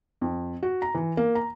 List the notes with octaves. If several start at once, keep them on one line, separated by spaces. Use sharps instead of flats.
F2
F#4
A#5
E3
A#3
A#5